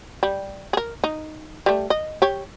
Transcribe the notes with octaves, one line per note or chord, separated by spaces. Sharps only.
G3
G#4 A#4
D#4
G3 A3
D#5
G4 C#5